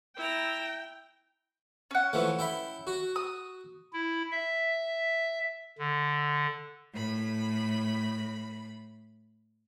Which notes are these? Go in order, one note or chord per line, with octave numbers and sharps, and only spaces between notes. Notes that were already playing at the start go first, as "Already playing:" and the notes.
E4 G5 A#5
C#4 F#5
E3 F3 A3
E4 G5 B5
F#4
D#6
E4
E5
D3
A2 B5